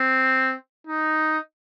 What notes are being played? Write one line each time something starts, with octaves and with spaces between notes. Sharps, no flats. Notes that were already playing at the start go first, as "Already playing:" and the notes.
Already playing: C4
D#4